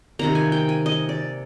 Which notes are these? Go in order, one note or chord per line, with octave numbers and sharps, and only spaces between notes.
C3 D#3 A#3 A#5
G#5
G5
G#5
D#5
D5